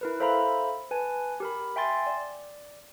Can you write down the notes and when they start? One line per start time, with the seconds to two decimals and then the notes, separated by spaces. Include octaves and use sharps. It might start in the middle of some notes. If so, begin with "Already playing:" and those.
0.01 E4 A#4 B4
0.20 A4 C5 E5 F5 A#5 B5
0.91 B4 G#5 A5
1.40 G4 A#4 B5
1.76 E5 G5 G#5 C6 A6
2.07 D5